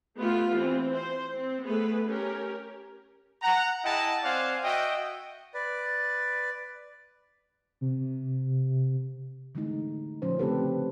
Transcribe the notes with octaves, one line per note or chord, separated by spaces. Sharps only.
A3 B3 F4 G4
E3 C4
C5
C4
A3 B3 G#4 B4
C#4 G4 A#4
F#5 A#5
E4 G#4 D#5 F#5 G5 A5
C4 C5 D5 F5 F#5 G#5
F#4 D#5 E5 G5
B4 D5
C3
D3 E3 G#3 A3 D#4
A#2 D3 F3 C#4 D4 C5
C#3 A3 C4 G4 A4 B4